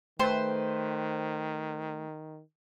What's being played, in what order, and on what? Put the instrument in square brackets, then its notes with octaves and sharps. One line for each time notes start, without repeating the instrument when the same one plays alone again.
[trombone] D#3 [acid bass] A3 [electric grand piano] B4 G5 [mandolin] C5